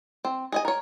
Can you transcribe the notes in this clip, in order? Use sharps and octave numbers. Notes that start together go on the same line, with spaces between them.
C4
G#4 D#5 G#5
A#4 C#5